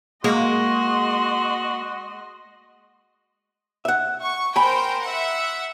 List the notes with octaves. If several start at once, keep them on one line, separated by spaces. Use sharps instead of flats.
G#3 A#3 F#4 D#5 C6
E5 F#5
C#6
A#4 C5 G5 G#5 B5
E5 F#5